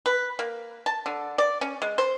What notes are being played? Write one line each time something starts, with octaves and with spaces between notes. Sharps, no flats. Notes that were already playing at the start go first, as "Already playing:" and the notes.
B4
A#3
A5
D3
D5
C#4
G#3
C5